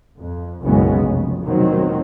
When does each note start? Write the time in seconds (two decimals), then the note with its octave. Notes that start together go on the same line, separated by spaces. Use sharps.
0.18 F2
0.62 F#1 B1 C#3 G#3 B3 C#4
0.98 F1
1.43 F1 G2 B2 D#3 F#3 C4